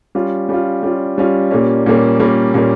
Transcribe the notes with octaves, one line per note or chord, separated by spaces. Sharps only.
G3 C#4 F4
G3 C#4 F4
G3 C#4 F4
G3 C#4 F4
A#2 G3 A#3 C#4
A#2 G3 A#3 C#4
A#2 G3 A#3 C#4
A#2 G3 A#3 C#4